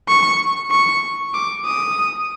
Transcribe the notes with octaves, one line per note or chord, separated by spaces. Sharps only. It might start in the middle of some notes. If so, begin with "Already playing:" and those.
C#6
C#6
D6
D#6